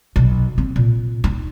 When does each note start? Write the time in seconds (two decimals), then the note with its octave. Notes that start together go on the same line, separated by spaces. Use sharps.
0.16 B1
0.58 C4
0.76 A#2
1.24 D#4